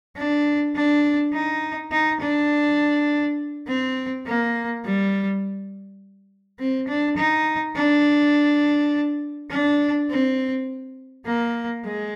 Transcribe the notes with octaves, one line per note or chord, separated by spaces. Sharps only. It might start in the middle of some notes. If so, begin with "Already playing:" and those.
D4
D4
D#4
D#4
D4
C4
A#3
G3
C4
D4
D#4
D4
D4
C4
A#3
G#3